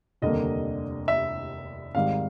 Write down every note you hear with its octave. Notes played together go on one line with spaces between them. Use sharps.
F1 D#2 D3 G3 A#3 D#5
E5
G#1 G#2 D#3 G3 F5